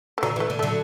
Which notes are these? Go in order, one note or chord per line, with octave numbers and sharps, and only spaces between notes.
A3
D3 F#3
E3
A3
D3
A3
D3 F#3